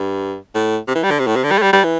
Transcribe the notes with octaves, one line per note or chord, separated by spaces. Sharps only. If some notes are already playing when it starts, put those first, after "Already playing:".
Already playing: G2
A2
C3
E3
G3
D3
C3
A2
C3
D3
G3
A3
G3
G3
E3